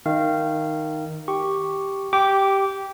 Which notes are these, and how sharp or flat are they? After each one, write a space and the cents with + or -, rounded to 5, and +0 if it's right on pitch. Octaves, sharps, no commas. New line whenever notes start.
D#3 +0 F5 -20
G4 +0 C#6 +0
G4 -5 D6 -20